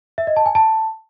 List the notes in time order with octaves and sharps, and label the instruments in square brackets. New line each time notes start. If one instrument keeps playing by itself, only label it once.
[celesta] E5
D#5
A5
G#5
A5